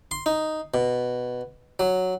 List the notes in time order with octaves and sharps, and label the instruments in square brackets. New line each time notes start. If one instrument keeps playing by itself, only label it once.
[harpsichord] C6
D#4
B2
F#3